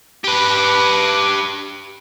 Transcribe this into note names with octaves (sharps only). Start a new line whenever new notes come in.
G4 B4